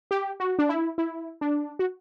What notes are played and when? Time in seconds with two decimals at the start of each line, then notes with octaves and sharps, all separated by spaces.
0.11 G4
0.40 F#4
0.59 D4
0.69 E4
0.98 E4
1.41 D4
1.79 F#4